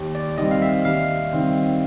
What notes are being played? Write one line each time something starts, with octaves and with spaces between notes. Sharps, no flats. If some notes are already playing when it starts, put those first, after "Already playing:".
Already playing: D#2
D5
D#3 G3 C4 D#5
F5
E5
D#2 F5
D#3 G3 C4